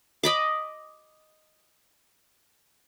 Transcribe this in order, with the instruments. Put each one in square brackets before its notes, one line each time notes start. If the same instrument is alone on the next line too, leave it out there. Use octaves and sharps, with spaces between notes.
[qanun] D#5 B5 D6